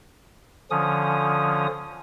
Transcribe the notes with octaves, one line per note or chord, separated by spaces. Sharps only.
D3 F3 C#4 D#6